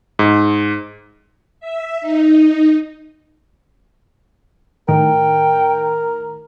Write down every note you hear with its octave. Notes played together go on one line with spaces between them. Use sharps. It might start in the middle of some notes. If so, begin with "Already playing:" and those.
G#2
E5
D#4
A2 D#3 A#4 G5